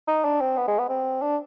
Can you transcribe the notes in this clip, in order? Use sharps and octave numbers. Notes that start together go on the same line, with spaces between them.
D#4
D4
C4
B3
G#3
B3
C4
D4